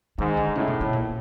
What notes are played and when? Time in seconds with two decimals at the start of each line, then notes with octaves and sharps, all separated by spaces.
0.18 G#2 D#3
0.37 D3
0.55 A2 C#3
0.68 B2
0.81 B2
0.93 A#2